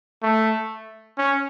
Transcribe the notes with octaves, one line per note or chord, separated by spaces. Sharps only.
A3
C#4